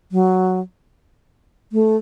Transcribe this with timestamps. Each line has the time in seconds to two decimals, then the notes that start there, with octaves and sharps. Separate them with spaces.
0.12 F#3
1.72 A3